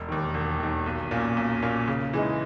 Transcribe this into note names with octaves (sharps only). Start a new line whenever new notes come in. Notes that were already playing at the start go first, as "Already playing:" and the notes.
Already playing: E1
D#2 D#3
E1
D#2 D#3
B1
A#2 A#3 C#4
B1
A#2 A#3 C#4
C#3
E3 G#3 D#4